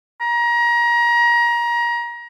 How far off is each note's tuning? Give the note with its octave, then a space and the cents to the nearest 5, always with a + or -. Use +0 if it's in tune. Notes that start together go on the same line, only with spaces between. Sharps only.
A#5 +30